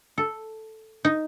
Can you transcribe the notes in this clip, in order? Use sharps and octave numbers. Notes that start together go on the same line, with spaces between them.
A4
D#4